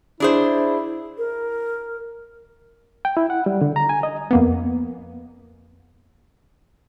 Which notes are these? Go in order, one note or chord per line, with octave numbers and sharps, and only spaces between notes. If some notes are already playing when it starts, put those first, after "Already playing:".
D4 E4 G#4 C5
A#4
G5
E4
F#5
G3
D3
A#5
G#5
D#5
F2 A#3 B3